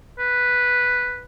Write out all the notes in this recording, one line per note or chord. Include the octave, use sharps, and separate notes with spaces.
B4